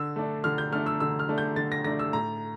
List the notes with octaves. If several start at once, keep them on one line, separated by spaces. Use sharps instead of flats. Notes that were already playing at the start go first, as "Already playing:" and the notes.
Already playing: D3 E6
A3 D4
D3 F6
G6
A3 D4 F6
E6
D3 E6
F6
A3 D4
G6
D3 A6
A#6
A3 D4 A#6
E6
A2 A#5